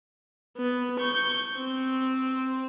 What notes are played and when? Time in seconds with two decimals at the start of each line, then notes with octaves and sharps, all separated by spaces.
0.57 B3
1.00 C#6 G6
1.58 C4